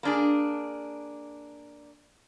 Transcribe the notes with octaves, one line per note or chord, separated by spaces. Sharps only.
A#3 D4 G#4